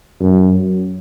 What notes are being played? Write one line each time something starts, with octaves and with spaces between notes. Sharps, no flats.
F#2